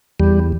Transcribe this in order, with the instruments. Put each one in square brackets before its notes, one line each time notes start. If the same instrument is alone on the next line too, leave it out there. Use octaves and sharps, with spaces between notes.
[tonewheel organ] E2 G3